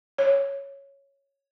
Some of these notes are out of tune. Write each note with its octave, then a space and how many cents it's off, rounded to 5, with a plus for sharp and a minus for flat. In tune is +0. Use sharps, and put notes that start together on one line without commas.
C#5 +0